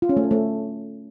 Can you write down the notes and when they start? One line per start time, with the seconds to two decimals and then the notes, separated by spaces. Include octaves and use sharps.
0.02 F4
0.09 C#4
0.17 A3
0.24 A4
0.31 A3